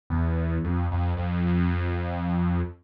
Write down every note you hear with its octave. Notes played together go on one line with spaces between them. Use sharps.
E2
F2
F2
F2